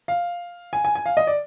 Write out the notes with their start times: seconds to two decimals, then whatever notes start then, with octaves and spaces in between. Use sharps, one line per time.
0.08 F5
0.73 G#5
0.85 G#5
0.95 G#5
1.06 F5
1.17 D#5
1.27 D5